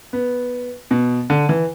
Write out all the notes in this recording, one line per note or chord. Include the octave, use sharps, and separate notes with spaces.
B3
B2
D3
E3